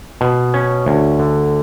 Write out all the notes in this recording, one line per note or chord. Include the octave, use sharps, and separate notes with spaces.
B2
C#4
D2
D3